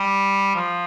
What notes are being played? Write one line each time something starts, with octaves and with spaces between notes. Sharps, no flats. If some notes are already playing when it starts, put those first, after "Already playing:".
Already playing: G3
F3